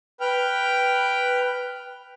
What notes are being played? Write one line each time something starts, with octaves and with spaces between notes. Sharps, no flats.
B4 G5 F6